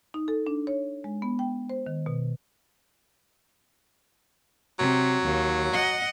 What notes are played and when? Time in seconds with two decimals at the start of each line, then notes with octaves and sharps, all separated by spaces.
0.14 D#4
0.28 A4
0.47 D4
0.67 C#5
1.04 G#3
1.22 B3
1.39 G5
1.69 C5
1.87 D#3
2.06 B2
4.79 C3 F#3
5.24 D#2
5.73 D#5 F#5